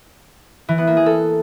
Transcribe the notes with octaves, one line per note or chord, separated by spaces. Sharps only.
E3
B3
A#3
G#4
A4